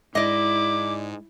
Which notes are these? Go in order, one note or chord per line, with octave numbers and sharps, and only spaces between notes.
G#2 E4 D5 D#5 D6